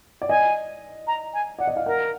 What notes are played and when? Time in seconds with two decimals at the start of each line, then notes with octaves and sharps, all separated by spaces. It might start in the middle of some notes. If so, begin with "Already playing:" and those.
0.22 D5
0.29 D#5 G#5
1.07 A#5
1.34 G#5
1.59 D5 F#5
1.67 D#5
1.77 F5
1.86 A#4 F#5